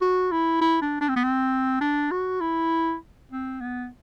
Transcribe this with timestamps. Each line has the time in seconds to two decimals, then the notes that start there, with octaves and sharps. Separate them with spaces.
0.01 F#4
0.32 E4
0.61 E4
0.82 D4
1.01 D4
1.09 C4
1.16 B3
1.24 C4
1.81 D4
2.11 F#4
2.41 E4
3.32 C4
3.61 B3